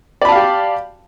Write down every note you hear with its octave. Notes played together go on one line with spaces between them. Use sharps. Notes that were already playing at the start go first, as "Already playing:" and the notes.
G4 D5 F5 A5 B5